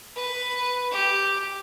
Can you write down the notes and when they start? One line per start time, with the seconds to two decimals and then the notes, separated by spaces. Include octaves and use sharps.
0.16 B4
0.92 G4